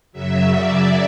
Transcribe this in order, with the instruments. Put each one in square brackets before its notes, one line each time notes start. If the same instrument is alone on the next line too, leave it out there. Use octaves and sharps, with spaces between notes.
[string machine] F#2 C#3 F#3 E5
D5